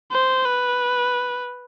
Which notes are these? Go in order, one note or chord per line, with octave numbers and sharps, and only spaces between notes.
C5
B4